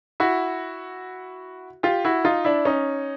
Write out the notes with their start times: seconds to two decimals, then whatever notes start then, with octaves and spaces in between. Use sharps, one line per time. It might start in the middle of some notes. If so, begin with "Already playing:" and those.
0.20 E4 F#4
1.83 F4 G4
2.05 E4 F#4
2.25 D#4 F4
2.45 D4 E4
2.65 C#4 D#4